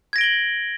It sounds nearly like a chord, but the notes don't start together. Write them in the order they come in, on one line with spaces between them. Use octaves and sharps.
G#6 A#6 D7 G7 F#7